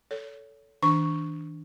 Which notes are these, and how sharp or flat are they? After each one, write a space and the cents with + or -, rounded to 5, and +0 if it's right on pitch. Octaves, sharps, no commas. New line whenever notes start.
A4 +0 C#5 +25
D#3 +45 D4 +0 C#6 +0